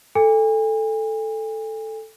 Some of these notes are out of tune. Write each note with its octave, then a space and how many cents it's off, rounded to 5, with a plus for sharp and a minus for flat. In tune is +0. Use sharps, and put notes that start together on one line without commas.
A4 +0 G#5 -40